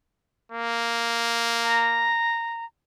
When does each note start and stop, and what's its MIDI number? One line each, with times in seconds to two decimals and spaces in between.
0.52 2.18 58
1.64 2.65 82